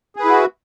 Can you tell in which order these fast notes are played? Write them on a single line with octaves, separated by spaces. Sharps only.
G#4 B4 E4 F#4